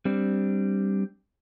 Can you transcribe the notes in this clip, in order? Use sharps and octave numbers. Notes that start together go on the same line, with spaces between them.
G3 C4 D4